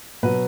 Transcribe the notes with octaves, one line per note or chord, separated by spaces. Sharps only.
B2 F#3 B4